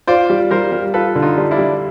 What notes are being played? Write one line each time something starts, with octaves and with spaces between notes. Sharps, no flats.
F4 C5 D5
G3
G3 A#4 C5
G3
F4 A4 B4
D3
D#4 F4
G3
D4 E4
G3